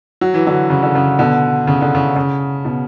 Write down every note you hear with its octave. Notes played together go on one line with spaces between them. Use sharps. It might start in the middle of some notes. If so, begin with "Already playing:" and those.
F#3
E3
D3 F#3
C#3
D3
C#3
B2 D3
C#3
D3
C#3
C#3
B2